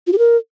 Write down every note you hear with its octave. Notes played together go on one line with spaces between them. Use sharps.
F4
G4
A#4